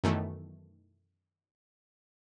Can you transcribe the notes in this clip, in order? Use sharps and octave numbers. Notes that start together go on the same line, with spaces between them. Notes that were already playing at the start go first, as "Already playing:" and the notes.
F#2 B2 D#3 E3 A3